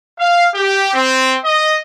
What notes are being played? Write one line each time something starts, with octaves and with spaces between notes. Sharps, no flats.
F5
G4
C4
D#5